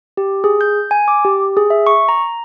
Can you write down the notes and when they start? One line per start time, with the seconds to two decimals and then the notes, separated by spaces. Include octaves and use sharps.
0.17 G4
0.44 G#4
0.61 G6
0.91 G#5
1.08 D6
1.25 G4
1.57 G#4
1.70 E5
1.87 C#6
2.09 A#5